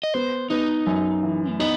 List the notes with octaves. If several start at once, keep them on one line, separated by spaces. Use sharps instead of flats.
D#5
B3 C5
B3 D#4
F#2
E3
A3
B3 D#4